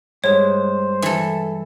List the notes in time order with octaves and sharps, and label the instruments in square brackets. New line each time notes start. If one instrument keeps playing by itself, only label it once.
[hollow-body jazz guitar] G2 G#3 [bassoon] C5 [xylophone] C#5
[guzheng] E3 A4